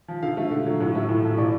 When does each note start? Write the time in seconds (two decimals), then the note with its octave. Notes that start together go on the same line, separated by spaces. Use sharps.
0.08 F3
0.23 D3 F5
0.37 A3
0.51 D3
0.66 F#3
0.81 A2
0.95 A3
1.09 A2
1.24 F3
1.38 A2 D5